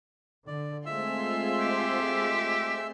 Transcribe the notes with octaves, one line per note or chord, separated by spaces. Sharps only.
D3 D5
G#3 A3 C4 F4 G#4 E5 C6 E6
G4